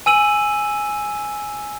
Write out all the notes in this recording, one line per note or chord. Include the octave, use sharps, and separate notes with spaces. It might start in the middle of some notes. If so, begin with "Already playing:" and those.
G#5 E6 D#7 F#7